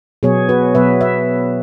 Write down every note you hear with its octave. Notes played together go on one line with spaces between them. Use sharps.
B2 F#3 B3 G#4 C#5
F#4 B4
B2 F#3 B3 B4 E5
B4 E5